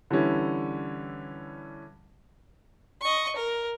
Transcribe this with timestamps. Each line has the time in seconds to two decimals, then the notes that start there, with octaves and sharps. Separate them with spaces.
0.11 D3 E3 G3 C#4 E4
3.02 D#5 C#6
3.36 A#4